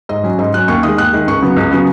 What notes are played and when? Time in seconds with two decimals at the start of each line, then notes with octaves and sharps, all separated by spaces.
0.09 G#2 D#5
0.23 F#3 C#4
0.39 G#2 D#5
0.53 F#3 C#4 F#6
0.68 D#2 C#6
0.83 D#3 G#3 D#6
0.98 D#2 F#6
1.13 D#3 G#3
1.28 C#2 C#6
1.42 C#3 F#3 B3
1.56 C#2
1.71 C#3 F#3 B3